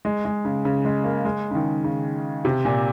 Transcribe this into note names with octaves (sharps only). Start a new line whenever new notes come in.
G#3
G#3
C#3
C#3
G#3
A#3
G#3
C#3
D#3
C#3
C3
A#2